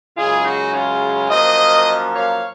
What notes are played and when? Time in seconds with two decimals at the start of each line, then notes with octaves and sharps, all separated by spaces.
0.16 F#2 C#3 G#3 F4 G#4
0.45 D#4 F#4
0.73 C#4 F4
1.30 F#2 F3 A#3 C5 D#5
2.14 C#5 F5